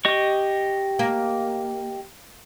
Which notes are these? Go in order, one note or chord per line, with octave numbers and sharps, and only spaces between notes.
G4 D#5 C#6
A#3